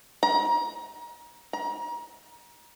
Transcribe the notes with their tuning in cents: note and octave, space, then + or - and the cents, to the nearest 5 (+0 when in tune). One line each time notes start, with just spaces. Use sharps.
A#5 +30
A#5 +30